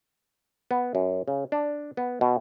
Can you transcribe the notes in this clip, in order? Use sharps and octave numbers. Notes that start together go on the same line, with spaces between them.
B3
F#2
C#3
D4
B3
B2